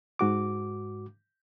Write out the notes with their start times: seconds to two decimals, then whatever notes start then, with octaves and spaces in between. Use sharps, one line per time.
0.19 G#2 F#4 D6